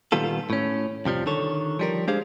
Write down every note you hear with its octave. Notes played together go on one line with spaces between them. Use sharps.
A#2 D#3 G3 B3 F4 A4
A2 C#4
F2 C3 F3 G3
D3 D#3 A4 C#5
F3 G3 A#4
G#3 D4 G4 G#4 C5 F5